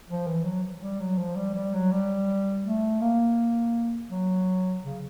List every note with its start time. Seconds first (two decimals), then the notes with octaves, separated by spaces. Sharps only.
0.09 F3
0.27 E3
0.45 F#3
0.81 G3
1.00 F#3
1.18 F3
1.36 G3
1.54 G3
1.73 F#3
1.91 G3
2.65 A3
3.01 A#3
4.10 F#3
4.84 C#3